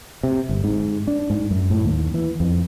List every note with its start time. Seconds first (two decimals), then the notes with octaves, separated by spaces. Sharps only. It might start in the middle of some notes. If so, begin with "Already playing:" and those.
0.23 C3
0.49 G1
0.64 G#2
1.07 D4
1.30 G#2
1.51 F#2
1.70 A2
1.85 D#2
2.14 E3
2.40 F2